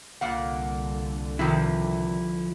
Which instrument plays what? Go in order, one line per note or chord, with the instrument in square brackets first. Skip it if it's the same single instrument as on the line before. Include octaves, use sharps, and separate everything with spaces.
[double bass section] C2 D3 [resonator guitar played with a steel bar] A#2 A#3 F#5
[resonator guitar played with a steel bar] C3 D#3 [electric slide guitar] F3 E4